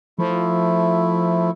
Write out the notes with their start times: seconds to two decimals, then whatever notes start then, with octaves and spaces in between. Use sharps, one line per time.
0.19 F3 A3 E4